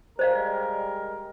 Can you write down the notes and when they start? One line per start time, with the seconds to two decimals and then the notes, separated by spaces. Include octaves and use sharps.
0.19 G3 G#3 A#4 C5 D#5 F5